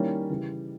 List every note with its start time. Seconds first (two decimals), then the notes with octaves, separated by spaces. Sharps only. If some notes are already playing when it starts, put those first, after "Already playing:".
Already playing: D#3 G3 A#3 C#4 E4
0.30 C#3 E3 G3